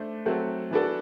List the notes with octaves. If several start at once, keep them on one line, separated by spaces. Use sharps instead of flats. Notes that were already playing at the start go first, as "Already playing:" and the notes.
Already playing: A3 D4 C5
F#3 A3 C4 F#4 A4
E3 B3 D4 F#4 A4